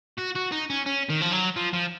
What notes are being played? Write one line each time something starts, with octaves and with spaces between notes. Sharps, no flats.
F#4
F#4
D#4
C#4
C#4
D#3
F3
F#3
F3
F3